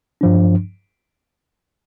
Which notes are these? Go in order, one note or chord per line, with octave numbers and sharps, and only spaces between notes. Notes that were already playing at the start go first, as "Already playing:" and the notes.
G2 F3 D4